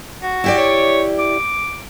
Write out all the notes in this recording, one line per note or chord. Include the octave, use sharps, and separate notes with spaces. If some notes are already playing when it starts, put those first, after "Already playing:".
F#4
E4 G4 D5
C#5
D6